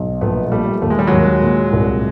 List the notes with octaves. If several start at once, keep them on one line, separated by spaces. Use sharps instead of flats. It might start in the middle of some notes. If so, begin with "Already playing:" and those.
Already playing: B1
A#1 A3 B3
A#2 G3 A3
D#2 A3
G#3
G3
D#2 F#3 G#3
A#2
C2